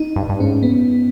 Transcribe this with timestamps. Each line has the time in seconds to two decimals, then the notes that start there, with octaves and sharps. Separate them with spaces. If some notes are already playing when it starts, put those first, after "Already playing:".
Already playing: D#4
0.16 G2
0.29 G2
0.39 G#2 C#4
0.63 B3